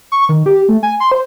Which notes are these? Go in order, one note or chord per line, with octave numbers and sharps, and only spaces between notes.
C#6
D#3
G4
A3
G#5
C6
C5